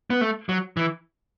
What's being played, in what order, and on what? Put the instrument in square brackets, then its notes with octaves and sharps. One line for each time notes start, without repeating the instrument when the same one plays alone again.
[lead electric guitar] B3
A3
F#3
E3